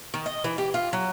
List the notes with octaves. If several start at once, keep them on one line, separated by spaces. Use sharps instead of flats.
D#3
D#5
E3
G4
F4
F#3